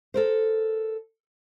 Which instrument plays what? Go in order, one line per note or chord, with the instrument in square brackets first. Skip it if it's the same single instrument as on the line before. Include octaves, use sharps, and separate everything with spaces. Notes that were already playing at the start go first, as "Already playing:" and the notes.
[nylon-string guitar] A4 A#4 C5